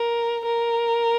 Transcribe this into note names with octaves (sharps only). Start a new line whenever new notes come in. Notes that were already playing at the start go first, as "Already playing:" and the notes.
Already playing: A#4
A#4